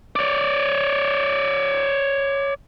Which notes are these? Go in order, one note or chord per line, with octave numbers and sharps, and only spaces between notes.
C#5 D5